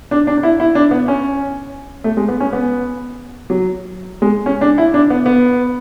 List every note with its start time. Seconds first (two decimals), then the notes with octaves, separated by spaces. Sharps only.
0.11 D4
0.27 D4
0.37 D4
0.43 E4
0.60 E4
0.75 D4
0.91 B3
1.08 C#4
2.04 A3
2.17 G#3
2.28 B3
2.40 C#4
2.53 B3
3.50 F#3
4.22 G#3
4.46 C#4
4.61 D4
4.78 E4
4.94 D4
5.10 B3
5.26 B3